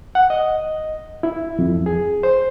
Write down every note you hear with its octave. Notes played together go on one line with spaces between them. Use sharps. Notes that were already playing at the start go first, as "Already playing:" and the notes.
F#5
D#5
E4
F2
G#4
C5